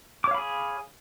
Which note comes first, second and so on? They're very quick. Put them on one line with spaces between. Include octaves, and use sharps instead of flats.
D6 C#5 F5 B5 G#4